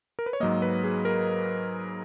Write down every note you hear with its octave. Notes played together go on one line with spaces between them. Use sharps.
A#4
B4
C#5
G#2 F#3 A#3 D#5
B4
G#4
A#4